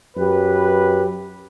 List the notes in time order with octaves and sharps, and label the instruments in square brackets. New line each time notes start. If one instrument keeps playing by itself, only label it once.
[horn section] F#2 G4 B4